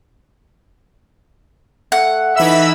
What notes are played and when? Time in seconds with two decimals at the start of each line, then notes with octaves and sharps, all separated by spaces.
1.92 A3 F#5
2.36 E3 A3 D#4 E5 B5 E6